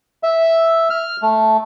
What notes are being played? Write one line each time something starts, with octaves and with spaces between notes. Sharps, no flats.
E5
F6
A3